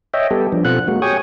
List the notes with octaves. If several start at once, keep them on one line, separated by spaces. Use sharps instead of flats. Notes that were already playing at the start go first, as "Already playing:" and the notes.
C#5 D#5 E5 G5
G3 B3 G4 A4
F3 D4
B2 C4 F4 A4 F#5 F#6
G#3 A#3 F#4
G4 C#5 G5 G#5 C#6 D#6